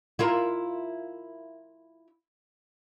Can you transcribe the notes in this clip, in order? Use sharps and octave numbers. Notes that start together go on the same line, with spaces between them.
E4 F4 A#4